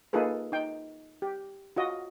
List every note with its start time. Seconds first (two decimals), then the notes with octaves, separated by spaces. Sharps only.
0.13 A#3 D#4 F4 G#4 A4 B4
0.52 D#4 G5
1.22 G4
1.76 F4 F#4 D#5